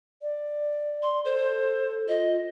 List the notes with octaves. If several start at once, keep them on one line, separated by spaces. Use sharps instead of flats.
D5
C6
A4 C5
F4 D#5